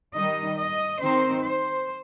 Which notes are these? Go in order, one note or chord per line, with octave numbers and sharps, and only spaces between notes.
D#3 G3 D#4 D#5
D#5
D#3 C4 D#4 C5
C5